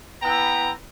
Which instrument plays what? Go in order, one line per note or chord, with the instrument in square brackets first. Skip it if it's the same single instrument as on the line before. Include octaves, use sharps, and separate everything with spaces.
[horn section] E3 B3 E4 G5 A#5